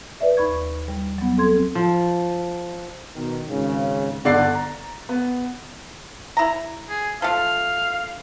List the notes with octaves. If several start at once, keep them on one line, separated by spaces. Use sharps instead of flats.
B4 D5 E5
D#2 B5 C#6 G#6
G3
F#3 B3
C4 A4 C6 G#6
F3
B2 D#3
G#1 C#3
G1 D3 D5 F#5 A6 C7
A#5
B3
E4 A#5
G#4
F3 A3 F5